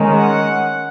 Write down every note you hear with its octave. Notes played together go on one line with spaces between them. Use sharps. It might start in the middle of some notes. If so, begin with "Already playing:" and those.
Already playing: D#3 G#3 C#4
F#5